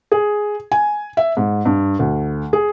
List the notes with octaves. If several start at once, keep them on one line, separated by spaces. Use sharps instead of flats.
G#4
G#5
E5
G#2
G2
D2
G#4